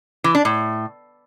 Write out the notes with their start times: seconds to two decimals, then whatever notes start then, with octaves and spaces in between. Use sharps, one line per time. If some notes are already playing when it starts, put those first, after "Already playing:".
0.24 E3
0.35 D4
0.45 A2